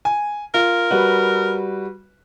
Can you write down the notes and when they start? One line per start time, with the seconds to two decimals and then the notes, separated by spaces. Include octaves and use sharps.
0.05 G#5
0.54 F4 A#4
0.91 G3 F#4 B4